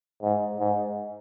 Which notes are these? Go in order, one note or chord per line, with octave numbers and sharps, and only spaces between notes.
G#2
G#2